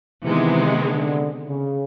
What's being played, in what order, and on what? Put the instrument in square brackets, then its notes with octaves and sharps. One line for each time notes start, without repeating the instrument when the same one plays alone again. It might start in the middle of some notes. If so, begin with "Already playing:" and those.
[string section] C3 D#3 G#3 B3 [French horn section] E3
[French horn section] D3
C#3